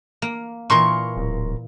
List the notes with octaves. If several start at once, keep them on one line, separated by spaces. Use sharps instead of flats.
A#3
A#2 E3 A#4 C6 C#6
D1